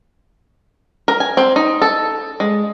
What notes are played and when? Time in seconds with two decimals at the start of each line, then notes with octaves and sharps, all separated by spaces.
1.08 A#4
1.20 G#5
1.37 C4
1.56 D#4
1.82 A4
2.40 G#3